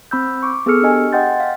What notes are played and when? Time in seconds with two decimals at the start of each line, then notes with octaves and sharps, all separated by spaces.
0.11 C4 B5 E6 G6
0.43 C#6 D6
0.66 B3 G#4 A4 E6 F6 C#7
0.82 D4 G4 D#5 G#5
1.13 D#5 F#5 G5 C6 G6 A6
1.40 F5